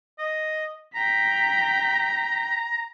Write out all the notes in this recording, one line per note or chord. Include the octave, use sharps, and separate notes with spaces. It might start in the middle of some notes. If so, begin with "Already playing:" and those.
D#5
G5 A#5 B6